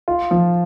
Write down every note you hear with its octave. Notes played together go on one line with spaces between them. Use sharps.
F4
F3